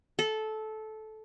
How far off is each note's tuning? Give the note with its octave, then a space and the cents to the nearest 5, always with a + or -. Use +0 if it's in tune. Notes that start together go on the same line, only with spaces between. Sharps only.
A4 -15